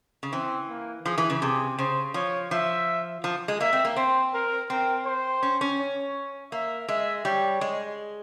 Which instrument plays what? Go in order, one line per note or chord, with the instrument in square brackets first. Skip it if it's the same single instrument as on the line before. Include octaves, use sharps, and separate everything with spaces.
[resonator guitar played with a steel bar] C#3
[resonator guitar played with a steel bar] E3 [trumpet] C4
[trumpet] A#3
[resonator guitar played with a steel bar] F3 [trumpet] G#4
[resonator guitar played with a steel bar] E3
C#3
[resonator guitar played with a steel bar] C3 [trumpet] G#4
[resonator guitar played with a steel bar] C#3 [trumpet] C5
[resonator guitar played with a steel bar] F3 [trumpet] C#5
[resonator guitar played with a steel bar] F3 [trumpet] E5
[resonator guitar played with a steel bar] F3
G#3
[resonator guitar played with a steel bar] A#3 [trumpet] E5
[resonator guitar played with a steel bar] C4
A#3
[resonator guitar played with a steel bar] C4 [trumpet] C5
[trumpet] A#4
[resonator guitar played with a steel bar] C4 [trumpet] A#4
[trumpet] C5
[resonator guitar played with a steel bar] C#4
C#4
[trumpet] C#5
[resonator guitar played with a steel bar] A#3 [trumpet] E5
[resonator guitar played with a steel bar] G#3 [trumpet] E5
[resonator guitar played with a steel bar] G3 [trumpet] C#5
[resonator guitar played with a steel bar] G#3